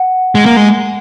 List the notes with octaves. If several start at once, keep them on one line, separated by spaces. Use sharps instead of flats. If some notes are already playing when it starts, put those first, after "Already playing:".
Already playing: F#5
G#3
A#3
G#3